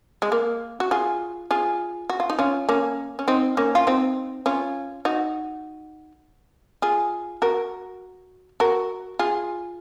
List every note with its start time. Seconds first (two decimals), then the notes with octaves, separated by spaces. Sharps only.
0.22 G#3
0.32 A#3
0.80 F#4
0.91 F4 G#4
1.51 F4 G#4
2.10 F#4
2.20 F4
2.30 D#4
2.39 C#4 F4
2.69 A#3 C#4
3.19 C#4
3.28 C4 D#4
3.57 A#3 C#4
3.75 F4
3.87 C4 D#4
4.46 C#4 F4
5.05 D#4 F#4
6.82 F4 G#4
7.42 F#4 A#4
8.60 F#4 A#4
9.19 F4 G#4